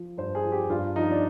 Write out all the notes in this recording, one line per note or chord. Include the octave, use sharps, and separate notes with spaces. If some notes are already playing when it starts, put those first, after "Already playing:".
Already playing: F3
G2 C5
G#4
F3
G4
G2 F4
F3 D#4
D4